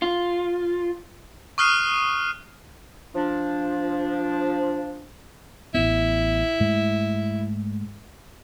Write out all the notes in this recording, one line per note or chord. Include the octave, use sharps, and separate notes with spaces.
F4
C#6 D#6 F6 F#6 C7 D#7
F3 D4
A1 B3 E4
G#2 G#3 A3